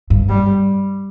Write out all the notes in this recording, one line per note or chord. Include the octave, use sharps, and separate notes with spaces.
G2
G3